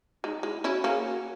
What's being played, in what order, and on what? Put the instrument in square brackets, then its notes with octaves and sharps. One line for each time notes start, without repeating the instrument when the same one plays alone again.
[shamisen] G#3 [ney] D#4
[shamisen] G#3 [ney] E4
[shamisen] C#4 E4 [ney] F#4
[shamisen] A#3 C#4 [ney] G#4
[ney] F#4